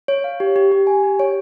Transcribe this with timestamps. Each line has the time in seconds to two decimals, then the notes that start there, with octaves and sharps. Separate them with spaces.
0.08 C#5
0.24 F5
0.40 G4
0.56 G4
0.72 G4
0.87 G#5
1.03 G4
1.20 C#5